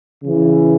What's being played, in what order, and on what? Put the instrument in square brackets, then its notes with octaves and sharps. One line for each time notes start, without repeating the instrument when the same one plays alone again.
[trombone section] C#3 E3